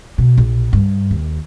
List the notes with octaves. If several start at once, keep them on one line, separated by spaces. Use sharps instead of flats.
B2
A#1
G2
D#2